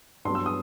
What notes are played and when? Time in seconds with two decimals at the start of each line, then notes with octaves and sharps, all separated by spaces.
0.25 G2 F#3 B3 C6
0.35 E6
0.46 D#6